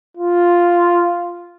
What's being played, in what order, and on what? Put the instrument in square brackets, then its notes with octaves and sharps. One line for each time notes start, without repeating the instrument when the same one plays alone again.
[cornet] F4